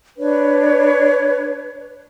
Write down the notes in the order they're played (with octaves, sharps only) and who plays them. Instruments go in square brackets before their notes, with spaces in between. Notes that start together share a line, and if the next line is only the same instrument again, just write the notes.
[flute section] D4 B4 C#5